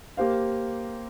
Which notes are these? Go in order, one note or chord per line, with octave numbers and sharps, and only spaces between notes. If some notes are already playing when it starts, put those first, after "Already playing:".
A#3 G4 C5 F5